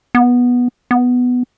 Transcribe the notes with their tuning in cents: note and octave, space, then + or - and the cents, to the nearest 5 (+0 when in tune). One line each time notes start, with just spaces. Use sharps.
B3 -10
B3 +5